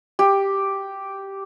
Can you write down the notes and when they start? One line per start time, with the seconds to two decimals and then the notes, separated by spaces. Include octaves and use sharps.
0.19 G4